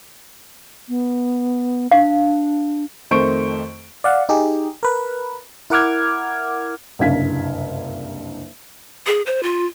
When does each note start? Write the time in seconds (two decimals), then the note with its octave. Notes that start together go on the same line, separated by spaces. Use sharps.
0.89 B3
1.91 D4 F5
3.11 F2 D#3 A3 C5 C#6 D7
4.04 D5 F5 F#5
4.29 D#4 G4 G#4
4.83 A#4 B4
5.70 E4 A#4 F#5 D6 F6 G#6
6.99 F#1 C2 G2 F5 G#6 B6
9.07 G#4
9.26 C5
9.43 F4